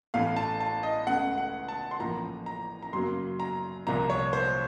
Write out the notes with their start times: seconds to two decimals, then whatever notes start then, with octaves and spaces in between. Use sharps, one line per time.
0.14 A1 A2 A3 F5
0.36 A5
0.60 A5
0.83 D#5
1.07 C#2 C#3 A3 F#5
1.38 F#5
1.68 A5
1.91 C6
1.99 A1 A2 F3 A#3 A#5
2.46 A#5
2.83 A#5
2.93 F#2 C#3 F#3 A#3 C6
3.40 A#5
3.87 C2 A#2 F3 A#3 A#5
4.10 C#5
4.33 C5